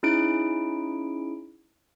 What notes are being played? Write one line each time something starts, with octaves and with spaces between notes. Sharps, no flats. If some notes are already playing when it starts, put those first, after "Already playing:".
C#4 D#4 E4 G#4 D7